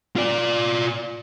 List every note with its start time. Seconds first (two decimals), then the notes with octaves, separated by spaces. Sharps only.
0.16 F4 D5